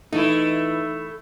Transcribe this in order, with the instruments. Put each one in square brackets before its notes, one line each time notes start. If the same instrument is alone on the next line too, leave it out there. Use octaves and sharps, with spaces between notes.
[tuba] E3 [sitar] A3 E4 [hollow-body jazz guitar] D#4